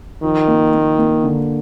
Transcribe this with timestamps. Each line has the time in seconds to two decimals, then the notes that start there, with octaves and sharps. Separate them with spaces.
0.23 D#3 F3
0.48 A#3
0.74 A#3
0.98 A#3
1.24 D3